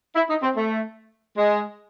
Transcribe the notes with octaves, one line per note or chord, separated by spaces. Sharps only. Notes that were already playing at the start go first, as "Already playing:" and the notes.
E4
D#4
C4
A3
G#3